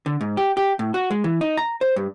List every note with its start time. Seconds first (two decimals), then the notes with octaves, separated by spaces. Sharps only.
0.06 D3
0.21 G#2
0.37 G4
0.57 G4
0.79 A2
0.94 F#4
1.10 G#3
1.24 E3
1.41 D#4
1.57 A#5
1.81 C5
1.96 G2